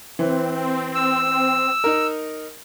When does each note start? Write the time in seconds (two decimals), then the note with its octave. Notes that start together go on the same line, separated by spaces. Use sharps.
0.19 E3 C4
0.95 E6
1.84 D#4 A#4